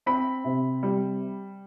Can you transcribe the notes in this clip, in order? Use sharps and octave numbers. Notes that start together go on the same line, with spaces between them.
C4 B5
C3
G3